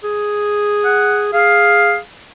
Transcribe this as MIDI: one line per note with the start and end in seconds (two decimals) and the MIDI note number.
0.04 1.33 68
0.85 1.25 78
1.34 1.99 68
1.34 1.96 77